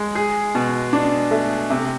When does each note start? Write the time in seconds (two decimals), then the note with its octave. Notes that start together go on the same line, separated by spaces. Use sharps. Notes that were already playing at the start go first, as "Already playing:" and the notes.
Already playing: G#3
0.15 G#4
0.55 B2
0.93 D4
1.31 A3
1.70 C3